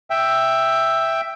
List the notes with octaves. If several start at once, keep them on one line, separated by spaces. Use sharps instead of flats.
E5 G5